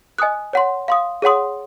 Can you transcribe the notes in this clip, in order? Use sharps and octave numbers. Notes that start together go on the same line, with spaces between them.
D#5 G#5 D#6 F#6
C#5 F#5 C6
F5 C6 D#6
G#4 C#5 F#5 C6 D#6